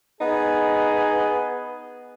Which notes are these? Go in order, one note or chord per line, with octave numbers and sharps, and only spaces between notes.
B3 D#4 G#4